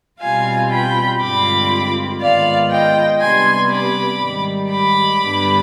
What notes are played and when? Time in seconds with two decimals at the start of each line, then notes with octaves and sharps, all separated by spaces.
0.20 B2 G3 C4 F4 F5 G#5
0.70 G5 B5
1.20 G2 D3 G#3 C4 F4 B5 D6
2.20 G#2 D#3 B3 F4 D5 F5
2.70 D#5 G5
3.20 C3 G3 B3 D4 G#5 C6
3.70 B5 D6
4.20 G#2 D#3 G3
4.70 B5 D6
5.20 G2 D3 G3 B3 D4